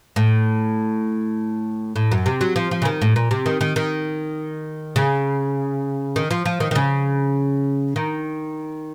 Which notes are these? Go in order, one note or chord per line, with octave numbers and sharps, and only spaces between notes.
A2
A2
F#2
C3
F#3
F3
F3
C#3
D#3
A2
A#2
C3
D#3
D#3
D#3
C#3
D#3
F3
F3
D#3
D#3
C#3
D#3